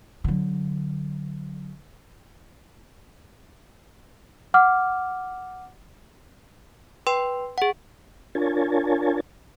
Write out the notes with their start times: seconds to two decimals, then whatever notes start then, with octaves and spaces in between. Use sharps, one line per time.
0.24 D3 F#3
4.54 F#5 D6 F6
7.07 B4 G5 C6
7.58 G#4 F#5
8.35 D4 F4 A#4 C#5 G#5 A5